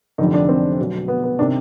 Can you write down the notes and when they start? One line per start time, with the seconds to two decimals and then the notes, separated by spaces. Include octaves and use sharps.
0.18 F1 F2 D3 D#4
0.34 D4
0.49 C4
0.79 B1 B2
1.08 B3
1.23 B3
1.39 C3 D#3 D4